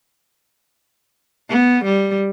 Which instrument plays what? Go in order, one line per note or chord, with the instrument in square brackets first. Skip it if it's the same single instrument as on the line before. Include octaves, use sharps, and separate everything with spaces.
[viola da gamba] B3
G3